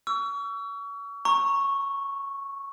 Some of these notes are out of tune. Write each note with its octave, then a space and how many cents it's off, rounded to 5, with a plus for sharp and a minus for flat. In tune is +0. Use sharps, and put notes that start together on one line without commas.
C#6 +35 E6 +25
A#5 +0 C#6 -5